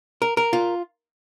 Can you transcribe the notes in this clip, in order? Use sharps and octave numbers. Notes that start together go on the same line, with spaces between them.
A#4
A#4
F4